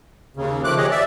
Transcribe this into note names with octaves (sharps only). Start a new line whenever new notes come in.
D#2 C#3
D#3 F3 A3 D6 F#6
G4 G#4 C#5 D#5
D5 E5